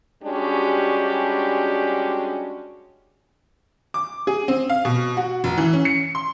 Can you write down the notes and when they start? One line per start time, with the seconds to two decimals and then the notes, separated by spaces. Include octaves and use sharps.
0.24 G3 G#3 C#4 D4 F#4 G4
3.94 D6
4.27 G#4
4.48 C4
4.70 F5
4.85 B2
5.17 F#4
5.44 F1
5.58 E3
5.73 C#4
5.85 C#7
6.15 C6